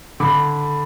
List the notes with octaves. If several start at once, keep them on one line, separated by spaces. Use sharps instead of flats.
D3 B5 D6